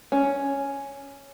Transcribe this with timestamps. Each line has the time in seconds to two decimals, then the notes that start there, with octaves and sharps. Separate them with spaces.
0.12 C#4